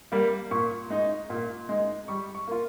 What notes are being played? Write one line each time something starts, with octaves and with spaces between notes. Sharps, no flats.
G3 A#3
A#2 C#6
G#3 D#4
A#2
G#3 D#4
G3 C#6
C#6
A#3 F4